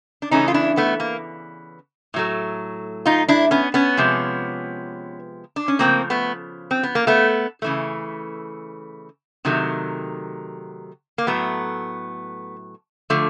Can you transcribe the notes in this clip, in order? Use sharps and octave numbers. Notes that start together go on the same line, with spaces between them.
D4
C#3 E3 A3 C#4 D#4
F4
D4 E4
A3 B3
A#3
A2 F#3 A3
D#4 F4
D4 E4
B3 C#4
B3 C#4
C3 F3 G#3
D4
C#4
C#3 F3 A3 A#3 C4
A3 B3
C4
B3
A#3
A3 B3
C#3 E3 A3
C3 D#3 F#3 A3
A#3
A2 F#3 A3 B3
D3 F3 A3